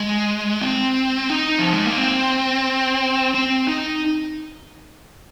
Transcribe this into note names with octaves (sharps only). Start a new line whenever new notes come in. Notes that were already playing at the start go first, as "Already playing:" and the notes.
Already playing: G#3
C4
D#4
F3
G#3
A#3
C4
C4
D#4